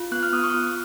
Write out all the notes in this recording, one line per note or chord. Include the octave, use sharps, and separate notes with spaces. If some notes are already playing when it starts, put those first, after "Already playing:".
Already playing: F4
B3 F#6
F6
B3 D#6
C#6
F4